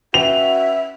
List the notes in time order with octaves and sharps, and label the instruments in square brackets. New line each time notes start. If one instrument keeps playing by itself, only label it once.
[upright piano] C#4 B4 G5 [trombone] F#4 [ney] E5 [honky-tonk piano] F7